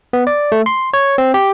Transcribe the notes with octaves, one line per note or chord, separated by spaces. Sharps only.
B3
D5
A3
C6
C#5
C4
G4